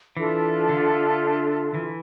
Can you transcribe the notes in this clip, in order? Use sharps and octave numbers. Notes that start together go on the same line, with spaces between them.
E3 D4 F4 A4 E5
D3
E3